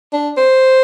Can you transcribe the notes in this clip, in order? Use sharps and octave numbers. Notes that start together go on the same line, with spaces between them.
D4
C5